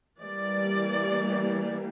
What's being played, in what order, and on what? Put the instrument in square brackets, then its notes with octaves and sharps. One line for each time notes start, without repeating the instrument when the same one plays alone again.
[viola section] E3 G3 A#3 D5